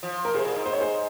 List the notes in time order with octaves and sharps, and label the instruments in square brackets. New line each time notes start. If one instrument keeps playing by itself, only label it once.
[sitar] F3
[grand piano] A#4
[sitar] C3 [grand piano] G#4 C5
[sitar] A#2
G#2
[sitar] G#2 [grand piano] C5
[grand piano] C#5
G#4 C5